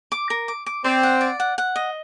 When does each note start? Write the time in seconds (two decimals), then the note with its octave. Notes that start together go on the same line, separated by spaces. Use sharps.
0.12 D6
0.30 A#4
0.48 D6
0.66 D6
0.84 C4 D5
1.03 F#5
1.21 D5
1.40 F#5
1.58 F#5
1.76 D#5